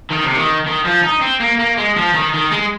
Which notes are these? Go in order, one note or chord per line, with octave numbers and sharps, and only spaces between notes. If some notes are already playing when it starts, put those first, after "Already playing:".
D#3
C3
D#3
D#3
F3
D#4
C4
A#3
A#3
G#3
F3
D#3
D#3
G#3